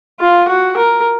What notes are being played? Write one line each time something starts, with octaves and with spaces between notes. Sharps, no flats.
F4
F#4
A#4